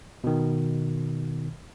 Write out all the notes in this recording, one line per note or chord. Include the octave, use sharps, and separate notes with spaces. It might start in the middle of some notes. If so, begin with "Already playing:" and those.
B2 D#3